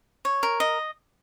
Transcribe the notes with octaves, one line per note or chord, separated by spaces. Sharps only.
C#5
A#4
D#5